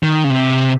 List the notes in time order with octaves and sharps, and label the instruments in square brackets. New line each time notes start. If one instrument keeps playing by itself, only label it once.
[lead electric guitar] D#3
C#3
C3